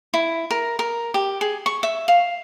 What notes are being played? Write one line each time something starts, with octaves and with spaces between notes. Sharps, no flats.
E4
A#4
A#4
G4
G#4
C#6
E5
F5